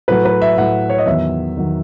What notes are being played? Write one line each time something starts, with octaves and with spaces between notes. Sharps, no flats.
A2 F#3 B4
B4
E5
A2 F#3 F#5
C#5
D#5
E2 D#3 F#3 E5
E2 D#3 F#3